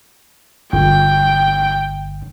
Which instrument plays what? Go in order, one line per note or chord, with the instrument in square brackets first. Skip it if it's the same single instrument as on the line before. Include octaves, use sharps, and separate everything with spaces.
[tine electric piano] G1 [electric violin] G5